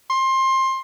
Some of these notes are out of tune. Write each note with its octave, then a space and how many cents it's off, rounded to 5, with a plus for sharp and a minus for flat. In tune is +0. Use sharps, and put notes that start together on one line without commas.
C6 +20